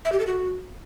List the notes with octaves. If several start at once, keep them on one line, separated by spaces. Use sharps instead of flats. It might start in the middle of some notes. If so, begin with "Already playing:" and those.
E5
G4
A4
F#4